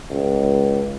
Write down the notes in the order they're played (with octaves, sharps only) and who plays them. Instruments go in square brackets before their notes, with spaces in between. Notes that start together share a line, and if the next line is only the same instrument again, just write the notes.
[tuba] C#2